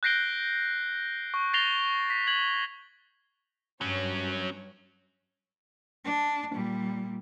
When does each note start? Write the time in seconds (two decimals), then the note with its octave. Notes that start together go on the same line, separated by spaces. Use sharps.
0.03 F#6 G6 A#6 C7 D7 G7
1.34 C#6
1.53 A6 A#6 C7 F7 G7
2.10 B6
2.27 G#6 F#7
3.81 G2 F#3 C#4 C#5
6.05 D4
6.53 A#2 G3